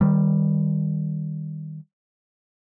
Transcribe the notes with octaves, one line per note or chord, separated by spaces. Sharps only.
D#3 G3